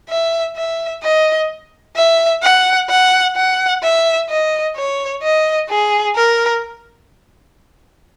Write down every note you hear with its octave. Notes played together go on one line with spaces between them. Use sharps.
E5
E5
D#5
E5
F#5
F#5
F#5
E5
D#5
C#5
D#5
G#4
A#4